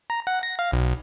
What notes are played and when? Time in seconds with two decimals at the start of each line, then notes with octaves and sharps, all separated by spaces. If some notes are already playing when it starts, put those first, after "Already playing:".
0.10 A#5
0.27 F#5
0.43 A#6
0.59 F5
0.72 B1